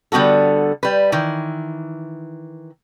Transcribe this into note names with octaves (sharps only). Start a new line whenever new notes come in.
D3 G3 B3 F#4 A4
G3 B4
D#3 E3